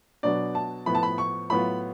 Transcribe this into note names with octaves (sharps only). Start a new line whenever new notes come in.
B2 F#3 B3 D4 D5
A5
A2 F3 B3 B5
A5
B5
C#6
A2 F#3 B3 F4 B5